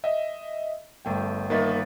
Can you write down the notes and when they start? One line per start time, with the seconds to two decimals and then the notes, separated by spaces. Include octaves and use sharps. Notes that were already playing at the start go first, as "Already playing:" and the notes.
0.04 D#5 E5
1.05 G1 A3 G5
1.50 G1 D#3 A#3 B4 E5 A6